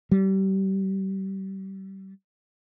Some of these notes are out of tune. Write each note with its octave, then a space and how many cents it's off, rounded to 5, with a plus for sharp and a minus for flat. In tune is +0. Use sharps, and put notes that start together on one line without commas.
G3 -30